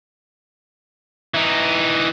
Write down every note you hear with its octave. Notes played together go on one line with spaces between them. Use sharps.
E3 D#4